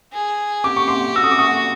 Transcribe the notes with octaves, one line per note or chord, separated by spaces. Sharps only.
G#4
G4 D6
C#6
C6 D6
F#4 E6
D#6
D6
C#6 D#6